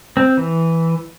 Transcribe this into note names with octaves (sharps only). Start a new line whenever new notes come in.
C4
E3